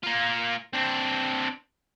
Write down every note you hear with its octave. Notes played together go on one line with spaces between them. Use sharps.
A#3 F4
C4 D4